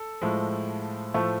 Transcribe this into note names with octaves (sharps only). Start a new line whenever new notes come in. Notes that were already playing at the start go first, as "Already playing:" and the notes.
Already playing: A4
A2 F3 G#3
A2 F3 A3